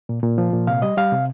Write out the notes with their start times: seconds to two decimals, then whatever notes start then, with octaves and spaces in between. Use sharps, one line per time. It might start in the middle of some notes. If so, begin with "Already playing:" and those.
0.09 A#2
0.23 A#2
0.38 F3
0.53 A#2
0.67 C3 F5
0.82 G3 D#5
0.97 G3 F5
1.12 C3